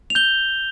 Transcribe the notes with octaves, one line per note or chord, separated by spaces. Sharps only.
F7
G6 G7